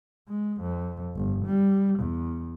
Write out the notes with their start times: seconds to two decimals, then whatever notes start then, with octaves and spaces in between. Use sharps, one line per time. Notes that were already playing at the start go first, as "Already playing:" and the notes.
0.28 G#3
0.61 F2
1.15 G1
1.46 G3
2.00 E2